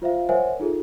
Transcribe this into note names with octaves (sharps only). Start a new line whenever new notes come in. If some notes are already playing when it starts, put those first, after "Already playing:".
F4 C5 E5 F5
A#4 C5 C#5 E5 F#5 G#5
D#4 F4 G#4 A4